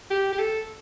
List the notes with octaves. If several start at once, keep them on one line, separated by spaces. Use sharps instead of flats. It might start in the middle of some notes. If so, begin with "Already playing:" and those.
G4
G4
A4